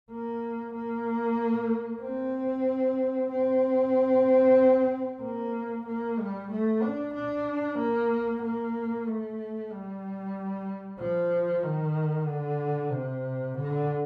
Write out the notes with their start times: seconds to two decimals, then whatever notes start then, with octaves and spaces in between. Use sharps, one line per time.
0.11 A#3
0.74 A#3
2.02 C4
3.31 C4
5.22 A#3
5.87 A#3
6.19 G3
6.51 A3
6.83 D4
7.14 D4
7.78 A#3
8.42 A#3
9.06 A3
9.71 G3
10.99 F3
11.63 D#3
12.27 D3
12.91 C3
13.55 D3